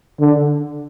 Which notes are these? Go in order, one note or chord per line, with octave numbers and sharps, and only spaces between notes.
D3